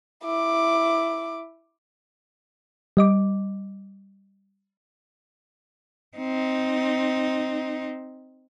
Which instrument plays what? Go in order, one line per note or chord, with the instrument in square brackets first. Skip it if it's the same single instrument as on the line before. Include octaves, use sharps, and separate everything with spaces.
[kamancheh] E4 D6
[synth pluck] G3 D#5 D6
[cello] C4 D#4